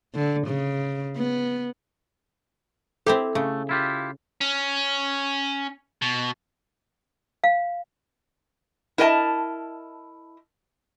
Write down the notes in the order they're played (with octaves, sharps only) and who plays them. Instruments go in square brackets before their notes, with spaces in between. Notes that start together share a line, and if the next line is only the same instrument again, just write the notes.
[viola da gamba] D3
C#3
B3
[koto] C4 E4 G4 [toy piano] A4
[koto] C#3 [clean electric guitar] A3
[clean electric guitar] E4 F4 G4
[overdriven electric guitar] C#4
B2
[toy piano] F5
[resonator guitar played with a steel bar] E4 A#4 D#5 G#5 A5